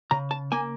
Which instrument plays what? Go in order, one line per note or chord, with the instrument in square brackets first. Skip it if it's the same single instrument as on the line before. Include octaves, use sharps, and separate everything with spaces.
[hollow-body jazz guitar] C#3 A#5
A5
A#3 G#5